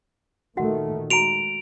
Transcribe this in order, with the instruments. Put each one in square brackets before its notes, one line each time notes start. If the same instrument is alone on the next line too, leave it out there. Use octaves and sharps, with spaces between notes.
[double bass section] A#2 D#3 A3 [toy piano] F#4 F#5
[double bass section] G#3 [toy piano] F#4 A#5 [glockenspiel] D7 F7